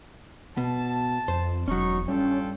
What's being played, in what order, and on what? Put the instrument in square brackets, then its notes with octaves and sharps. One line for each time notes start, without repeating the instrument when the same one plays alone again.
[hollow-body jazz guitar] B2 [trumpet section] A5
[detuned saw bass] F2 [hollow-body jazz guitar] C5
[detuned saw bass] E1 [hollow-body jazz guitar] F#3 C#4 [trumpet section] D#4 C#6
[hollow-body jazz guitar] G2 [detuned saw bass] C#4 [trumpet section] F4 A4 G5